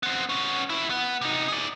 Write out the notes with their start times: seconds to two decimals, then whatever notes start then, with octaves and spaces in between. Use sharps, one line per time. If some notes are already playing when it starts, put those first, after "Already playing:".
0.03 B3 C4
0.29 B3 C#4
0.70 D#2 E4
0.90 B3
1.21 C3 D#4
1.48 G#4 D5